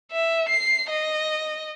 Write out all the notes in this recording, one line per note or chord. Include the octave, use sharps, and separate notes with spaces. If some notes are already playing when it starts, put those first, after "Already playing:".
E5
C7
D#5